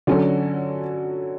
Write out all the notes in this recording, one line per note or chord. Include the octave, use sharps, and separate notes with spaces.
D3 F#3 C#4 F#4 A4